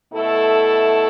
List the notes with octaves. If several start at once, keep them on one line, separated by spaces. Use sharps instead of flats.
B2 A3 E4 A4